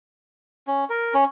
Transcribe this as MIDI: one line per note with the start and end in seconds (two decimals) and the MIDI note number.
0.67 0.84 61
0.90 1.14 70
1.14 1.24 61